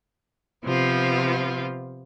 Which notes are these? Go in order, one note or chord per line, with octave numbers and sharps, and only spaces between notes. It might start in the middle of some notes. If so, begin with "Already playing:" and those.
C3 F3 B3 F4